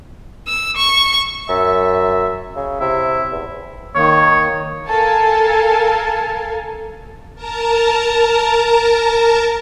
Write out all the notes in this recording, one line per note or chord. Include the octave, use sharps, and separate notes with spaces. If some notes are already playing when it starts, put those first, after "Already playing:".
E6
C#6
F#2 E5
C#3
C3 E4
E2
D#3 A#3 C#5
A4 A#4 F5 G#5 A5
A#4 A5 A#5